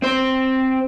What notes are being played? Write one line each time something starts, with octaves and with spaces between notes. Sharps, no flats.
C4 C5